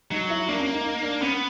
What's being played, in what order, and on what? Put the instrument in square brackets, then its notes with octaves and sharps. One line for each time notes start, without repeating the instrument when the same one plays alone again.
[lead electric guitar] F#3 [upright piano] D#4
[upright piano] E4
[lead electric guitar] A#3 [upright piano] D4
[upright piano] C#4
D#4
D#4
D4
[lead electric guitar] B3 [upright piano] C#4